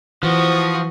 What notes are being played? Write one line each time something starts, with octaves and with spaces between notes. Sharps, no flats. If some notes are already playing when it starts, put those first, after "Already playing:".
E3 F3 F#4 D#6